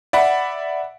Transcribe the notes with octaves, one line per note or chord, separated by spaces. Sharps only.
D5 E5 F#5 B5